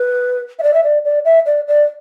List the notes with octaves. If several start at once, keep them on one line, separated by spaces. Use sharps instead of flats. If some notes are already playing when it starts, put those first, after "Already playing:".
Already playing: B4
E5
D5
E5
D5
D5
E5
D5
D5